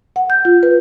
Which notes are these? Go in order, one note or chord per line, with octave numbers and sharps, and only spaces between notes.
F#5
G6
F4
B4